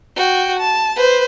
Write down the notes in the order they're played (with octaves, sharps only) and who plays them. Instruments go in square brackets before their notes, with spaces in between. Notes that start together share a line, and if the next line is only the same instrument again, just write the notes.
[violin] F#4 G5
A5
B4 C5